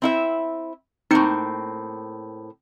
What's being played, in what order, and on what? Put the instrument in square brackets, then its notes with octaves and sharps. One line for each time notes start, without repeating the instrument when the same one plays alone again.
[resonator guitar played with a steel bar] C4 E4 E5
[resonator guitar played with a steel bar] A2 A#3 C4 [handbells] D#4 C#7